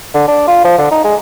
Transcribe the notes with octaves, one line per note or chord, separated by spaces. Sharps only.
D3
D4
F4
F3
D3
D#4
G#3